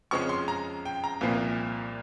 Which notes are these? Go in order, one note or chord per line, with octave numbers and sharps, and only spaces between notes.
F2 C#3 F3 G#3 C#4 C#6
C6
A#5
G5
A#5
C2 A#2 F3 A#3